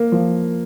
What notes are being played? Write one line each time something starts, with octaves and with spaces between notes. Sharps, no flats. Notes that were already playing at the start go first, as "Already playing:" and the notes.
Already playing: A#3
F3